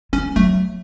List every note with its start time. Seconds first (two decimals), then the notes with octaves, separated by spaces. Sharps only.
0.13 G#3 C#4
0.36 F#3 A3